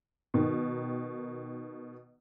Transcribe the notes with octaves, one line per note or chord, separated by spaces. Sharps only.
B2 D#3